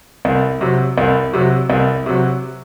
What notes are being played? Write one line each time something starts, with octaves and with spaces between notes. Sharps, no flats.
C2
C3 F#3
C2
C3 F#3
C2
C3 F#3